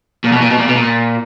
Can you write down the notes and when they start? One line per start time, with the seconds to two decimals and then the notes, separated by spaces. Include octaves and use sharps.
0.24 A#2
0.32 B2
0.42 A#2
0.50 B2
0.58 A#2
0.68 B2
0.76 A#2